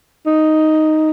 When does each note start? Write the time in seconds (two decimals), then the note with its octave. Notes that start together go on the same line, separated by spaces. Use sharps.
0.26 D#4